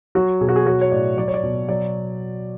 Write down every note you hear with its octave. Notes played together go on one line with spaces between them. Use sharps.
F#3 F#4
B2 G#4
F#4
G#4
F#3 F#4
C#5
A2 D5
F#3 D5
C#5
D5
B2
F#3 D5